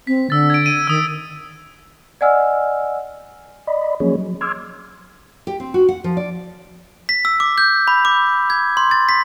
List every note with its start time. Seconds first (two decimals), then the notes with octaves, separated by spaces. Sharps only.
0.07 C4 B6
0.30 D3 E6 A6
0.50 G#6 D7
0.66 D#7
0.87 D#3 D#6 E6
2.21 D5 D#5 F#5 G#5 E6 F6
3.67 D5 D#5 B5
4.00 F3 F#3 A#3 C#4 G#4 C#5
4.18 F#3
4.41 C6 D6 E6 F6 G#6
5.47 G4
5.60 C4
5.74 F#4
5.89 F#5
6.04 F3
6.17 D5
7.09 B6
7.25 E6
7.40 D6
7.58 G6
7.88 B5
8.05 D6
8.50 G#6
8.77 C6
8.91 A6
9.09 B6